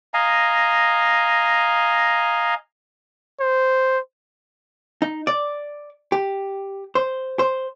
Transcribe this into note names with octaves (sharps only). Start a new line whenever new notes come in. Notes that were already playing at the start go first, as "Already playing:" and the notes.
D#5 F5 G#5 A#5
C5
D#4
D5
G4
C5
C5